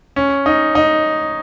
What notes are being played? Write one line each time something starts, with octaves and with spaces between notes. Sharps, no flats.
C#4
D#4
D#4